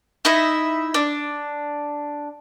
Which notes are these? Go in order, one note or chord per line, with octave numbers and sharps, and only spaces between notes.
D#4 E4 D#5 E5
D4